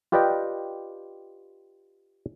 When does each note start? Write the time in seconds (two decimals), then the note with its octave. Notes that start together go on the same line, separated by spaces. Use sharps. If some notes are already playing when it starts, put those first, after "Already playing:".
0.12 F4 G4 B4 D5 D#5 G5